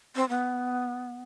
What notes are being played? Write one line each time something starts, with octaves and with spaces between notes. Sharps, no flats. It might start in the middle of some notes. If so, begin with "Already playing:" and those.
C4
B3